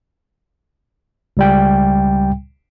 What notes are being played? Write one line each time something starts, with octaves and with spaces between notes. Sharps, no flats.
C#2 G3 G5